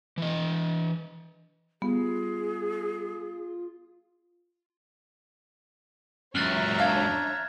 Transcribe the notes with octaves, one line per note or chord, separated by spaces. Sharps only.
E3 D#5
G3 B3 F4 G#4
C#2 F#2 C#5 E5 A#5 F6 F#6 A6
D4 F5 F6 G#6